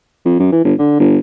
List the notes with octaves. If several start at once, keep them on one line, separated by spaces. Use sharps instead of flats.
F2
F#2
E3
G1
D3
G1